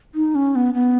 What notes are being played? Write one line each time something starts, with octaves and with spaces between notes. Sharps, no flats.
D#4
C#4
B3
B3